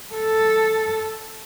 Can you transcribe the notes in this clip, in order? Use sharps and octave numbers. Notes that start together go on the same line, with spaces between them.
A4